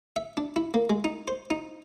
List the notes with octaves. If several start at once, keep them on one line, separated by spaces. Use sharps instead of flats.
E5
D4
E4
A#3
G#3
D#4
C5
D#4